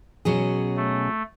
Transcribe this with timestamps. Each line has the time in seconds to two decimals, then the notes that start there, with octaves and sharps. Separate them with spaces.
0.25 B2 F#3 C#4 G#4
0.77 A3